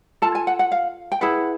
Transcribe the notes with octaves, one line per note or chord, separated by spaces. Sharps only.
F4 A4 A5
G#5
F#5
F#5
F5
G5
E4 G#4 B4 F#5